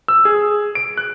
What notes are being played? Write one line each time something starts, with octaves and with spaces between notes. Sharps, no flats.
E6
G#4
D7
F#6